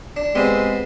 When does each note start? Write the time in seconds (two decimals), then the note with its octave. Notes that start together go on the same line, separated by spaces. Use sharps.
0.16 D4
0.35 G#3 B3 C4 G4